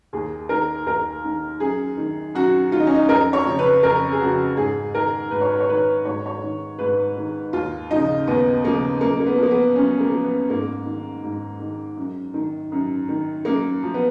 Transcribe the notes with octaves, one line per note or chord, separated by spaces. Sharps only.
D#2 G#4
D#3 A#4
D#2 A#4
D#3
F#2 G#4
D#3
F#2 F#4
D#3 F4
D#4
C#4
D#4
F2 A#4
C#5
C#3 F3
B4
F2 A#4
G#4
C#3 F3 F#4
G#2 G#4
D#3 A#4
G#2 B4
C#5
B4
C#5
D#3 B4
G#2 C#5
C#5
D#3
G#2 B4
D#3
D#2 F4
C#3 F3 D#4
D#2 B3
C#3 F3 A#3
F#2 A#3
A#3
B3
F3 A#3
B3
F#2 C#4
A#3
F3
B3
G#2 A#3
D#3
G#2
D#3
F#2
D#3
F#2
D#3
F#2 A#3
F3
B3